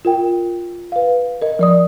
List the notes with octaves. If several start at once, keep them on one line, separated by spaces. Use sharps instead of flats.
F4 A#4 G5
B4 F5
A#4 D#5
F3 D5 D#6